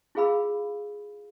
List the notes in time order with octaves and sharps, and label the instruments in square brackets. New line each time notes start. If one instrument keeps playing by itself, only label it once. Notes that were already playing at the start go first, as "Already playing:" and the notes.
[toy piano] E4 F4 G#4 F5 B5 E6